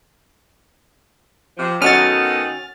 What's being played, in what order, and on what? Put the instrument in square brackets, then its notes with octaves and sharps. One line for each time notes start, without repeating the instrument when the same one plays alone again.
[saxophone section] C3 F3
[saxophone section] D#3 A4 D#5 [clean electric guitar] B3 [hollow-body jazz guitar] C#4 F#4 [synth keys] F6 A6